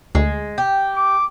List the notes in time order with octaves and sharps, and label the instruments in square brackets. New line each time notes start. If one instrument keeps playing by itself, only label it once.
[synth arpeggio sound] D2 [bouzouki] G#3
[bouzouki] G4
[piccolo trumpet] D6